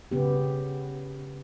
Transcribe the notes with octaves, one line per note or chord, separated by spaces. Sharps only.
C#3 B3 G4